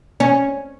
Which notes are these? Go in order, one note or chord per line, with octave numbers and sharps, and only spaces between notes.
C#4